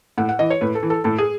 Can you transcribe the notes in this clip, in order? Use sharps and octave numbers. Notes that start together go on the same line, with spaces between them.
A2 F#5
F#5
E3 D#5
C#5
A2 B4
A4
E3
A4
A2 A4
G#4